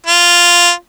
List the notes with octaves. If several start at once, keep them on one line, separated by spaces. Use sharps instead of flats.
F4